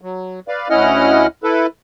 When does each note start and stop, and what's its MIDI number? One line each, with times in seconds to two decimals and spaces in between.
0.01 0.40 54
0.48 0.68 71
0.48 0.68 74
0.48 0.68 77
0.70 1.27 38
0.70 1.27 61
0.70 1.27 64
0.70 1.27 75
0.70 1.27 78
0.70 1.27 89
1.44 1.66 64
1.44 1.66 69
1.44 1.66 71